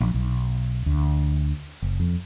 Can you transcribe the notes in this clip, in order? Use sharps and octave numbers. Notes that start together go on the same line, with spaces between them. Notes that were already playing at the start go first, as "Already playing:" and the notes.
A#1
B1
D2
F#1
F2